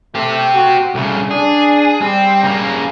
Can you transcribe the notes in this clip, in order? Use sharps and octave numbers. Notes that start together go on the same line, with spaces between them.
A3 C4 G4
F#4
C2 C#3 A3
D4 G#4
G3 C4
C#3 A#3